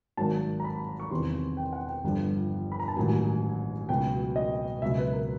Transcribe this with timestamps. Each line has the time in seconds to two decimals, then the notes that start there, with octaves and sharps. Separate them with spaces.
0.17 G#1 G#2 D#3 F#3 A5
0.60 A#5
0.64 B5
1.00 C#6
1.11 E2 C3 D#3 C6
1.57 G5
1.73 F#5
1.88 G5
2.04 G1 G2 D3 F3
2.72 B5
2.80 A#5
2.88 A5
2.96 A1 G#2 D#3 F#3 G#5
3.89 C#2 B2 F#3 G5
4.36 D#5
4.82 C#2 B2 F#3 E5
4.98 B4
5.13 A#4